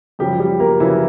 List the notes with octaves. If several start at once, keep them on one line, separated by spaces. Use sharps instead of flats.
F#2 C#3 F3 G3 G4
G3 G4
A#3 A#4
F#2 C#3 E3 F3 E4